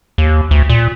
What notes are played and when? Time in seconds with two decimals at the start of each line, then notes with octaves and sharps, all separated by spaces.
0.18 D#2
0.51 D2
0.69 A#2